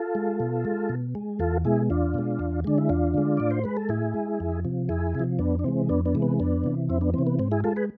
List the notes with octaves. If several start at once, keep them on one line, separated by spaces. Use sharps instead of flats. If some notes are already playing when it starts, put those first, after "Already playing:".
Already playing: F4 A4
G#3
B2
G#3
B2
G#3
E2 F4 A4
B2 G#3 E4 G#4
E2 D4 F4
B2 G#3
E2
D3 G#3 D4
E4
E2 D4 F4
D3 G#3
A2 D5
C5
G#3 B4
A4
A2 E4 G#4
G#3
F2
C3 F3
F2 E4 G#4
C3 F3
F2 B3 D4
D4
C3 E3 G#3 C4
F2 B3 D4
B3 D4
C3 E3 G#3
B3
F2 B3 D4
C3 E3
F2 C4 E4
B3 D4
C3 E3 C4
B3
G#2 C4
E4 G#4
G#3 F4 A4
G#4 B4